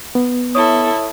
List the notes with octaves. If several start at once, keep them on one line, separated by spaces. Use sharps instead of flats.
B3
E4 A4 C#5 C#6 D#6